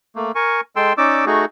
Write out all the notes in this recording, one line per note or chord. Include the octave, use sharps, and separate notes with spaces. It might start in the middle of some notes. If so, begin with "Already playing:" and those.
A3 A#3
A#4 G#5 C#6
G#3 A4 G5 C6 E6
C#4 D#4 D5 D6 E6
A3 D#4 F#4 G#4